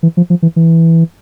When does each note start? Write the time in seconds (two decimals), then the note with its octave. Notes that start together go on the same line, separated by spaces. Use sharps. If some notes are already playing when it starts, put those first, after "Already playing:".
0.03 E3
0.17 F3
0.30 F3
0.42 E3
0.56 E3